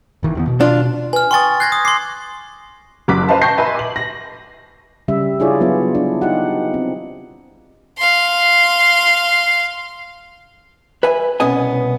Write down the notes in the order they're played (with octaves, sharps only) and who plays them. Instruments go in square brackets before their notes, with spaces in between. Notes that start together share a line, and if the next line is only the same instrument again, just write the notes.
[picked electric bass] G1 D#3 E3
E2 E3 B3
B2
[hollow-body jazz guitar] D4 F4
[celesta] B4 [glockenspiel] G#5 F6
[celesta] G5 G#5 D#6 [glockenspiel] C6 C#6 A6
[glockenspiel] F#6 G#6 A#6 [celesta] C7
[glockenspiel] D#6
[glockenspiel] C6 C7 [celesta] D6
[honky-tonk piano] F#1 F#3 D6 F#6 B6
B4 C5 D#5 F5 A5 C6
G5 A5 C#6 G6 A#6 C7
B4 D#5 E5 G#5 A5 C6
D6 F#7
A#6
[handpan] C#3 G3 E5
D4 E4 F4 G#4 C#5 D5
F#3 B3 F4
D4 E4
D#4 F4 G4 F#5
C4
[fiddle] F5 C6
[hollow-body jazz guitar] B4 E5 G#5
C2 B2 B3 C#4 D#5 G#5